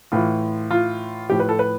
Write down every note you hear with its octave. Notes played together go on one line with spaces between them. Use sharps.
A2 E3 F4
F4
A2 F3 G4
B4
A4
B4